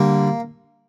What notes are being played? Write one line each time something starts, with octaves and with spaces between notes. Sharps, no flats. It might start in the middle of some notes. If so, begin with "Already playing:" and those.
Already playing: D3 G3 A#3